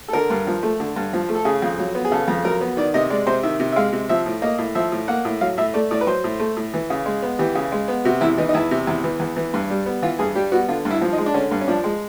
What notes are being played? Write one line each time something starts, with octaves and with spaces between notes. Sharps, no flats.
A4
D3 A#4
G2
F3
A3
D3
G2
F3
A3
A4
C#3 G#4
F2
F#3
B3
G#4
C#3 A4
F2
F#3 A#4
B3
D#3 D5
C3 D#5
G#3 D5
C3 C5
D#3 E5
C3
E5
G#3 F5
C3
F3 E5
A2
A#3 D#5
A2
F3 E5
A2
A#3 F#5
A2
F#3 F5
A2 E5
A3 D5
A2 D5
B4
F#3 C5
A2
A3
A2
E3
C#3
G#3
B3
E3 G4
C#3
G#3
B3
C3 F#4
E2 E4
E3 D#4
D#4
E2 E4
C3
E2
E3
E2
E3
G2
G3
B3
E3 F4
G2 G#4
G3 G4
B3 F#4
D3 F4
G2
E4
F3
D#4
G#3
D4
D3 C#4
G2
C#4
F3 D4
G#3